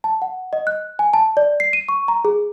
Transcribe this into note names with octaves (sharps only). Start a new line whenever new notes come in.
A5
F#5
D#5
F#6
G#5
A5
D5
C7
D#7
C#6
A#5
G#4